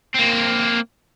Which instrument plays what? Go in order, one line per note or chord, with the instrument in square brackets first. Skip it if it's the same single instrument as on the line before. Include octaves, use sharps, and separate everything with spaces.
[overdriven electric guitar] A#3 C4